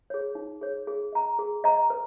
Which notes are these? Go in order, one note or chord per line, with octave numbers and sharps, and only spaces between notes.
G#4 C#5
D#4
G#4 C#5
G#4
D#5 A#5
G#4
D#5 A#5
B4